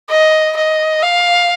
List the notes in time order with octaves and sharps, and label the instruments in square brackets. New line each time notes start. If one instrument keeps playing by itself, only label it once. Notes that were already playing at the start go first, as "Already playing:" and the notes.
[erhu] D#5
D#5
F5